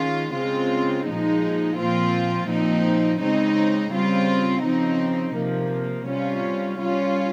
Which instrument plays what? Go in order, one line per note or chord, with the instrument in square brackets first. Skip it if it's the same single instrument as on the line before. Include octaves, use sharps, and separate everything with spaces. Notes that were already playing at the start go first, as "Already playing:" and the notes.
Already playing: [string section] D#3 G#3 C#4 F4
C#3 G#3 C4 F4
A#2 F3 G#3 D#4
A#2 F3 C4 F4
A#2 F3 C4 D#4
C#3 G#3 C4 D#4
C#3 G3 C4 F4
C#3 F3 C4 D#4
C3 F3 A#3
C3 G3 C#4 F4
G3 C#4 F4